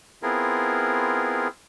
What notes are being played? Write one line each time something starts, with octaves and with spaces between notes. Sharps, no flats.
B3 C4 E4 F4 G#4 A#4